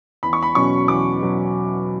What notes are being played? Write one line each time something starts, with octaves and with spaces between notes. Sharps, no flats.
E2 B5
C#6
B5
B2 F#3 C#4 C#6
E2 D6
B2 F#3